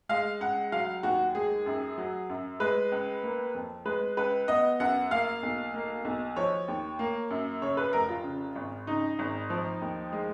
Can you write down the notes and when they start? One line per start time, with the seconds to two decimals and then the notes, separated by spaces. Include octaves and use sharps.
0.09 G#3 F5
0.40 C#2 F#5
0.72 F#3 F5
1.03 D#2 F#4
1.35 G#3 G#4
1.66 F#2
1.98 F#3
2.29 F#2
2.60 G#3 B4
2.92 C#2
3.23 A#3
3.55 F2
3.85 G#3 B4
4.17 C#2 B4
4.48 B3 D#5
4.80 F#2 F#5
5.11 A#3 F5
5.43 B1
5.74 A#3
6.05 B1
6.36 F3 C#5
6.68 D#2
6.99 A#3
7.30 F#2
7.62 C#3 C#5
7.77 B4
7.93 F1 A#4
8.09 F4
8.24 C#3
8.56 G#1
8.87 C#3 D#4
9.19 G#1
9.50 F3
9.82 D#2
10.12 G#3